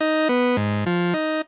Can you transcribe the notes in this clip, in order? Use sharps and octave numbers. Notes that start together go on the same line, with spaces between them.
D#4
B3
G#2
F3
D#4